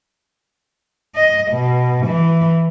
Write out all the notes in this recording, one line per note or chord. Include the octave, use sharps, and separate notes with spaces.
D#5
B2
E3